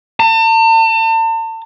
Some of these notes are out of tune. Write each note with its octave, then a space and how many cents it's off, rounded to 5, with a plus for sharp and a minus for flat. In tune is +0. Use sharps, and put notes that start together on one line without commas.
A5 +40